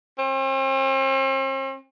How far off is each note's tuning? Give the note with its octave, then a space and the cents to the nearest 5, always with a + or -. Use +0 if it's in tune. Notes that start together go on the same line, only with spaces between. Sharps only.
C4 +45